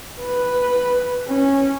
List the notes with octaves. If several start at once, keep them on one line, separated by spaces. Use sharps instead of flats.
B4
C#4